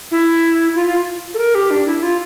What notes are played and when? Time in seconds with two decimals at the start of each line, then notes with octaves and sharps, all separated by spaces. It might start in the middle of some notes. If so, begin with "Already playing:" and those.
0.11 E4
0.75 F4
0.86 F4
1.34 A4
1.38 A#4
1.55 G4
1.71 D4
1.86 E4
2.03 F4